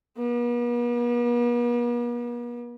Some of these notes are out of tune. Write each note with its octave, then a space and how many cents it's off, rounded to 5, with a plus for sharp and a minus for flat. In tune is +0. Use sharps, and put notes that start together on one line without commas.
B3 -45